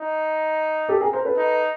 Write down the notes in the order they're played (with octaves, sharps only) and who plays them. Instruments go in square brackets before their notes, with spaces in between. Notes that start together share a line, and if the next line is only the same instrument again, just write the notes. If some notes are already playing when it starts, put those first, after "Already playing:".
Already playing: [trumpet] D#4
[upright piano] G4 A4
G#4 A#4
A#4 C5
A4 B4
[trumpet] D#4